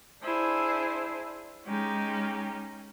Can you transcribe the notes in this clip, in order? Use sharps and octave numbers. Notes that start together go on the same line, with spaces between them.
D4 E4 G#4 C5
G#3 C#4 D#4 G4